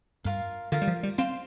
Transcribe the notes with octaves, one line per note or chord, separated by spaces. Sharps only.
G2 F4 A#4 F5
D3 F4 A#4 F5
G3
F3
G3
C4 C5 F5 C6